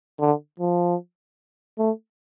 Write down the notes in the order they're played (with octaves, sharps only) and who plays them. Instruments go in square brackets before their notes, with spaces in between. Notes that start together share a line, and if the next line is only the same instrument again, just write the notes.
[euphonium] D3
F3
A3